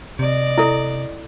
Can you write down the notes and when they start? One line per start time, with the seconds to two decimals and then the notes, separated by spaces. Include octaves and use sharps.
0.19 C3 D5 D#5
0.58 E4 A4